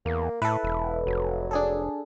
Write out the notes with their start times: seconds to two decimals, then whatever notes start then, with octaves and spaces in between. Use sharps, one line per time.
0.06 E2 A#3
0.42 A2 E4 A4 B4
0.63 E1
1.07 F1 F#3
1.51 D4 G#4 A4